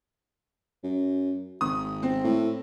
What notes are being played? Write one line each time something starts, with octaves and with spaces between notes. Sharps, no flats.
F#2
G#1 D#6
C4
A2